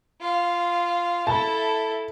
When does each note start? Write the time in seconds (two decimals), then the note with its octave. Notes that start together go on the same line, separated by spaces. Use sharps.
0.21 F4 F5
1.27 E4 A4 A5